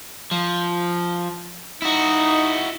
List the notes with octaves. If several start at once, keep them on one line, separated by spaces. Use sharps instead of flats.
F3
D#4 E4 F#4